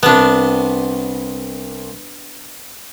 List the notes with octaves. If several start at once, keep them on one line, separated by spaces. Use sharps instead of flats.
C2 C3 B3 D4 A5